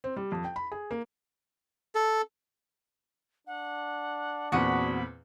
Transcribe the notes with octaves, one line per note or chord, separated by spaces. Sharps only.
C4
G3
F2
G5
B5
G#4
A#3
A4
D4 F#5
E2 A#2 C4 F#4 F#5 B5 D#6